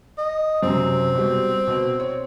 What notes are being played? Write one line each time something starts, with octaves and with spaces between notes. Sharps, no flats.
D#5
F#2 C3 C4
B2 G3
B2
C#5